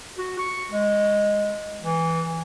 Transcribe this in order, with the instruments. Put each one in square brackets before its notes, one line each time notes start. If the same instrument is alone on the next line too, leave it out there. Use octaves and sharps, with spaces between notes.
[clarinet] F#4
C#6
G#3
E3